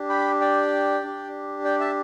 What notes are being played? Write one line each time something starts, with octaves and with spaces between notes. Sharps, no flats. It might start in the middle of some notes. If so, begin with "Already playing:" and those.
Already playing: D4 G4
G5 B5
D5 G5
D4 G4
D5 G5
E5 A5